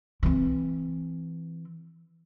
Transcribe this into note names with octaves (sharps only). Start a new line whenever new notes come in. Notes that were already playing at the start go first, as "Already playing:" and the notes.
E3 C4